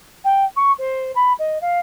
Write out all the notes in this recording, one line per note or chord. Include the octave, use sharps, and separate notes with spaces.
G5
C#6
C5
B5
D#5
F5